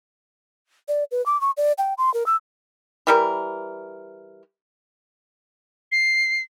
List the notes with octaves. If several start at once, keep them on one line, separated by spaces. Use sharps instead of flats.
D5
B4
D6
C#6
D5
G5
C6
A#4
E6
E3 G3 A#4
C7